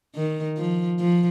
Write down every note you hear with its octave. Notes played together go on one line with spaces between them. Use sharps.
D#3
F3
F3